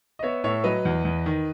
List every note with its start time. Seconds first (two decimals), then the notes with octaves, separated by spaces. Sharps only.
0.19 D#5
0.23 B3 C#5 E5
0.44 A2 C#5 E5
0.64 F#3 B4 D#5
0.85 E2
1.05 E2
1.26 D#3